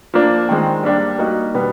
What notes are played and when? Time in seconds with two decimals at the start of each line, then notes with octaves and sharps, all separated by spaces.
0.14 F3 A#3 D4
0.49 D#3 G#3 C4
0.83 G3 A#3 D4 G4
1.19 G3 A#3 D#4 F#4
1.54 B2 G3 B3